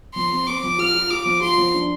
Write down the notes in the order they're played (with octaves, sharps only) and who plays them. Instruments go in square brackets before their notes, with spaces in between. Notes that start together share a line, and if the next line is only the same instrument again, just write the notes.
[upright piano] F3 [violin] C6
[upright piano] C4
[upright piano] C4 [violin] D6
[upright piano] F3
[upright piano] F4 [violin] F6
[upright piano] F4
[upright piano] F4 [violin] D6
[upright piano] F3
[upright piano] F4 [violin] C6
[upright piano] F3
D4